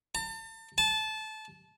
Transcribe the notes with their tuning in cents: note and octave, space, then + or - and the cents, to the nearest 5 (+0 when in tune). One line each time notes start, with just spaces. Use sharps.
A5 +35
A5 -20